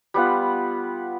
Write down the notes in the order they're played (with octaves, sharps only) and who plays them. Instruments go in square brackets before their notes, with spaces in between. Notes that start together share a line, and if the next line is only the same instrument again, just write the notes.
[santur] G3 B3 F4 F#5